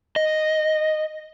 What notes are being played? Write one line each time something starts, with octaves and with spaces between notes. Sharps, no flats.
D#5